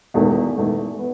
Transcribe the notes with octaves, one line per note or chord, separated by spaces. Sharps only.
E1 E2 D#3 A3
E1 E2 D#3 A3
B3